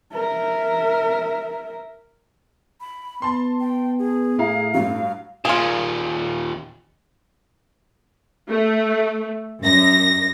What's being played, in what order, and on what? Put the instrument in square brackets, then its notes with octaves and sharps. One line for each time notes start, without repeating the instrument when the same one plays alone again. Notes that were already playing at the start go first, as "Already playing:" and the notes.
[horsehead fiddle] A#4 E5
[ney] B5
[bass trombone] B3 [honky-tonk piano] A5 C6
[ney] G5
G#4
[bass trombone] A2 [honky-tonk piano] E4 F5 A#5
[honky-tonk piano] G2 F#3 [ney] F5
[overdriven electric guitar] D#2 A#2 [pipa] F4 G#4
[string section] A3
F#2 A#6